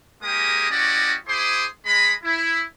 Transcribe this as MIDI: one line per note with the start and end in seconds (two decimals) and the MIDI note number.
0.22 0.68 56
0.22 0.68 58
0.22 0.68 67
0.22 0.68 68
0.22 0.68 70
0.22 0.68 87
0.70 1.15 61
0.70 1.15 64
0.70 1.15 66
0.70 1.15 67
0.70 1.15 74
0.70 1.15 75
1.27 1.65 64
1.27 1.65 68
1.27 1.65 72
1.27 1.65 84
1.27 1.65 86
1.27 1.65 87
1.85 2.12 56
1.85 2.12 83
2.23 2.62 64